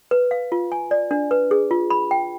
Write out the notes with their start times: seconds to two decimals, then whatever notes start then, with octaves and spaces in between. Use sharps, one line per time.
0.11 B4
0.31 F5
0.52 F4
0.72 G#5
0.91 D5
1.11 D4
1.31 B4
1.51 G#4
1.71 F4
1.90 B5
2.11 G5